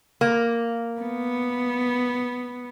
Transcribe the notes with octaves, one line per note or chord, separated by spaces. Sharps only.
A#3
B3